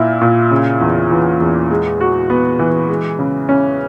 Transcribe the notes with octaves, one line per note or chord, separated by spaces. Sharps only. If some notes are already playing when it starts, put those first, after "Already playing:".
Already playing: A#2 A#3 E4
A#2
C#3
E2
E3
E2
G#3
F#4
B3
E3
G#3
C#3
C#4